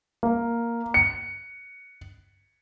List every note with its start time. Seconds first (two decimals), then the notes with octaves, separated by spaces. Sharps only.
0.23 A#3
0.94 C#7